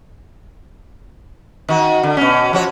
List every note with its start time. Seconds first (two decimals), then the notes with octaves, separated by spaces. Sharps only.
1.69 D#3 F#4
2.03 D3
2.17 B2 C#4
2.53 F3 F#4 C#5